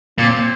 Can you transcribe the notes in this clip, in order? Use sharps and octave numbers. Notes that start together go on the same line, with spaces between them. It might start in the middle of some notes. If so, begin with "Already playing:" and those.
A#2 C4